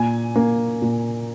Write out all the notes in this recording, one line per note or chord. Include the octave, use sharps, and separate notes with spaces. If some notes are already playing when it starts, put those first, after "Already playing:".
Already playing: A#2 G#5
A#3
A#2